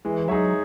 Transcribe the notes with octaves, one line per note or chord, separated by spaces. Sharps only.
E3 G#3
F#3 D#4 G#4 C#5 E5